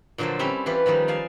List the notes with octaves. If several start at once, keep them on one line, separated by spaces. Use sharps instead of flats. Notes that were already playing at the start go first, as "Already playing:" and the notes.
A#2 D3 F3 F#3 A4 C5
G3 C4 C#4 E4 G4
E3 F4 G4 B4
D#3 F3 G3 D#4
D5 F5 G#5 A5